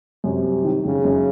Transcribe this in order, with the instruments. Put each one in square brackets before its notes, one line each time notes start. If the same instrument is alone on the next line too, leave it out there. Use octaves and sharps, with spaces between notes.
[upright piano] F#2 [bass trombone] C3
[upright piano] G3
D#3
[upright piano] F#2 [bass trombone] C#3
[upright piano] F#2